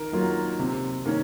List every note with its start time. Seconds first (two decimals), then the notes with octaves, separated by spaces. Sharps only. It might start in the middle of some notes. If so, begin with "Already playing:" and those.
Already playing: D#3 A#4
0.12 F#3 A#3 F4
0.59 C3
1.05 D#3 A#3 C#4